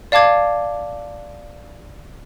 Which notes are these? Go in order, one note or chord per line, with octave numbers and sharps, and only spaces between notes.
D5 F5 A5 D6 G#6